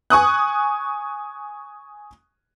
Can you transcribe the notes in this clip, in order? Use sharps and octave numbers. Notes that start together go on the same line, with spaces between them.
G#5 C#6 D#6 F#6